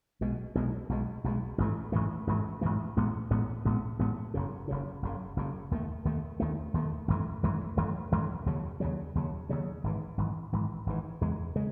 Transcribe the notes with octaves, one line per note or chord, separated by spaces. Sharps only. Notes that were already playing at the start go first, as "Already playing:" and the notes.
B1 B2 G#3
B1 B2 G#3
B1 B2 G#3
B1 B2 G#3
A1 G#2 E3 A3
A1 G#2 E3 A3
A1 G#2 E3 A3
A1 G#2 E3 A3
A1 A2 G#3 B3
A1 A2 G#3 B3
A1 A2 G#3 B3
A1 A2 G#3 B3
F#1 F#2 C#3
F#1 F#2 C#3
F#1 F#2 C#3
F#1 F#2 C#3
D#2 D#3 A3
D#2 D#3 A3
D#2 D#3 A3
D#2 D#3 A3
G#1 F#2 E3 A3
G#1 F#2 E3 A3
G#1 F#2 E3 A3
G#1 F#2 E3 A3
D#2 C#3 F#3
D#2 C#3 F#3
D#2 C#3 F#3
D#2 C#3 F#3
G#1 G#2 E3
G#1 G#2 E3
G#1 G#2 E3
G#1 G#2 E3
E2 C#3 G#3
C#3 G#3